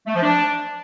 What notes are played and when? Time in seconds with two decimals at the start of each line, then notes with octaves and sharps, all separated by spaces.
0.07 A3
0.15 F3
0.23 D4